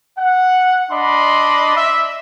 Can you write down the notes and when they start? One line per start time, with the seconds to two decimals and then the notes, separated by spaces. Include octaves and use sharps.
0.18 F#5
0.91 D4 D5 D#5 B5 C6 D6
1.77 E5